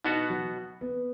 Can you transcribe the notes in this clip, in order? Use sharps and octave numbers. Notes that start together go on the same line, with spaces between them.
B2 B3 D#4 F#4
F#3
B3